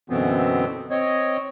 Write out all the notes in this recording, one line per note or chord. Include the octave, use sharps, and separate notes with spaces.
F#2 B2 D3 E3 B3 C4
C4 C#5 D#5